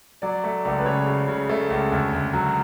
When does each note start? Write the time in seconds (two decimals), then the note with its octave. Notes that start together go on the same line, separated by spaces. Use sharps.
0.22 F#3 D5
0.44 A3
0.65 C#2 D5
0.79 B4
0.86 C#3 C#5
1.06 C#3
1.28 C#3
1.50 A3
1.70 C#2
1.92 D2
2.13 D2
2.33 F#3